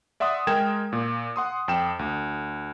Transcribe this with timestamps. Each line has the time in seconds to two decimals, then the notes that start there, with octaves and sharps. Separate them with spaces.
0.20 D5 E5 F#5 C6 D#6
0.47 G#3 A#4 G5 G#6 E7
0.93 A#2
1.36 F#5 C6 D#6
1.68 F2 G5 E7
1.99 D2